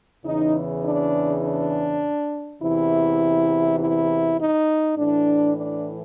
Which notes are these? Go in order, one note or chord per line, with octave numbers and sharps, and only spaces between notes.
E2 C#3 E3 D#4
D4
D4
E2 C3 E3 E4
E4
D#4
A2 E3 D4
D4